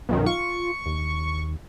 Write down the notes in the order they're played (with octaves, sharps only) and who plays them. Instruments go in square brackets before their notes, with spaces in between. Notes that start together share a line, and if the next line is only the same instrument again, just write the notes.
[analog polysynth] B1 F#2 D#3
[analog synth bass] F4 [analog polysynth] C#6
[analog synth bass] D#2